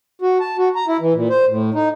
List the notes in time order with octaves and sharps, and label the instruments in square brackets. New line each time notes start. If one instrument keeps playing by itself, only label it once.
[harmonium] F#4
A5
F#4
A#5
E4
E3
A#2
C5
A2
D#4